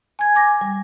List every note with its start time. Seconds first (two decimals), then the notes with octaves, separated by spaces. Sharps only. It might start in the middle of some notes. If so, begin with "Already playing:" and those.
0.19 G#5 G#6
0.35 G#5 D6 A#6
0.61 G3